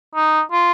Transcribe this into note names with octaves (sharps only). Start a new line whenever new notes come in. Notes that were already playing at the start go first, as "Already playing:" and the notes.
D#4
F4